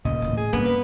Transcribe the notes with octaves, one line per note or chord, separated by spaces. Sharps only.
D#1 A#2 C#3 B3 D#5
A2 E3
G#4
G2 C#3 A#3 B3
B4